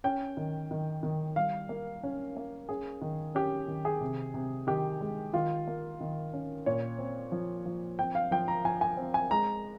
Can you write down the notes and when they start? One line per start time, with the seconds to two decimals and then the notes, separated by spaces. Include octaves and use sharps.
0.04 C#4 G5
0.37 D#3
0.71 D#3
1.03 D#3
1.36 G3 F5
1.69 A#3
2.03 C#4
2.37 A#3
2.69 C#4 G#4
3.02 D#3
3.35 C#4 G4
3.68 D#3
3.85 G#4
4.01 C3
4.34 C3
4.67 D#3 G4
5.01 G#3
5.33 D#3 F4
5.67 A#3
6.01 D#3
6.33 C#4
6.66 A#2 C#5
6.99 C4
7.32 F3
7.65 F3
7.99 C4 G5
8.15 F5
8.31 F3 G5
8.48 A#5
8.64 F3 G#5
8.81 G#5
8.97 C4
9.14 G#5
9.31 G#3 A#5